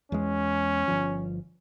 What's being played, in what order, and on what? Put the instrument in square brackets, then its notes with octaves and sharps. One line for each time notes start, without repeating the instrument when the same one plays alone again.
[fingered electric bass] E2 G#3 [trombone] C#4
[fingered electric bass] G1 F3